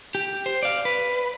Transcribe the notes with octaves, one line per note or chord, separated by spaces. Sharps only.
G4
C5
D5 F5
B4